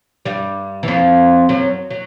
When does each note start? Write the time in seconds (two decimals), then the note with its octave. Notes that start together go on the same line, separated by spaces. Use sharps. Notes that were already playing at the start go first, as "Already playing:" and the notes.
0.25 G2 G3
0.83 E3
0.88 F2 F3
1.49 F#2 F#3
1.90 F#3